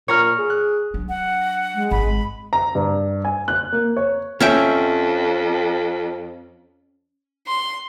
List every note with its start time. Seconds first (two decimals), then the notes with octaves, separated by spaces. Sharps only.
0.08 A#2 C#5 A#5 F6
0.38 G#4
0.50 F#6
0.94 F#3 D4
1.09 F#5
1.75 G#3
1.91 G#1 B5
2.53 A#5
2.75 G2
3.25 G#5
3.48 F#6
3.72 A#3
3.97 C#5
4.41 F2 C#4 E5 G5
7.47 C6